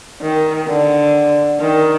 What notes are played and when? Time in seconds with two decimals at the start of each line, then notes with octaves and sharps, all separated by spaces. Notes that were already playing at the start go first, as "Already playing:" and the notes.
0.21 D#3
0.68 D3
1.61 D#3